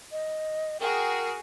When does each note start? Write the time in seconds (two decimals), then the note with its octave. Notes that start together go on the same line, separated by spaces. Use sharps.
0.12 D#5
0.81 F#4 G#4 A#4 G5